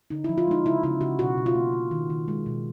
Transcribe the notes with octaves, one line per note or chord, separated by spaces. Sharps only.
D3 D#4
F3 E4
F4
G#3 D#4
C#3 E4
C#3 E4
C#3 F#4
B2 F#4
B2
F4
A#3
A#3
D#3
D#3
G#3
B2